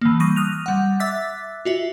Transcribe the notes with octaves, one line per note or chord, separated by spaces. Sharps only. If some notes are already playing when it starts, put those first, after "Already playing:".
E3 A#3
G3 C#6 D#6 A#6 D#7
D#6 F6 F#6 A#6 F7
G3 F#5
E5 D6 E6 F#6 A6 B6
F4 F#4 E5